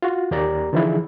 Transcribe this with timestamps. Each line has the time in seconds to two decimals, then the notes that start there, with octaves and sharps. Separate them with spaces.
0.02 F4 F#4
0.31 D#2 A#3 G4 D5 A#5
0.73 D3 E3 F3 D#4 E4 G#4